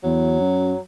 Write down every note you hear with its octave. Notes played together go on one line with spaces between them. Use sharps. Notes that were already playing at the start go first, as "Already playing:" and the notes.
E2 F#3
F#2